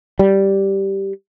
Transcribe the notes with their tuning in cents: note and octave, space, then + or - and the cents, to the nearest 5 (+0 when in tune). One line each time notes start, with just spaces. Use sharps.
G3 -5